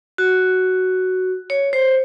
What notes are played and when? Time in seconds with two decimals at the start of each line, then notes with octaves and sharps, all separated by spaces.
0.18 F#4
1.50 C#5
1.73 C5